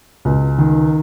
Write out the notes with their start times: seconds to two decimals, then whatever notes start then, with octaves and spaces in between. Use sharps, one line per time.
0.25 C#2
0.58 D#3